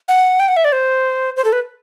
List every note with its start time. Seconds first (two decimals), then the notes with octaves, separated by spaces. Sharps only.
0.08 F#5
0.40 G5
0.48 F#5
0.57 E5
0.65 D5
0.72 C5
1.36 C5
1.45 A4
1.53 B4